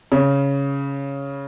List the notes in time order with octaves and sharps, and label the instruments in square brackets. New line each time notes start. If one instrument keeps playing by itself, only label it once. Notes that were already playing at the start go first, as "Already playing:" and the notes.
[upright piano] C#3